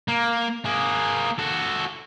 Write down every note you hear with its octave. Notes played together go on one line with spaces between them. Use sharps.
A#3
A#3 G#4
F#4 A4